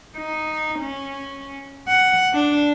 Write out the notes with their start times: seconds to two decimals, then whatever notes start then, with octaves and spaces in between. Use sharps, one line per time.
0.17 D#4
0.80 C#4
1.88 F#5
2.34 D4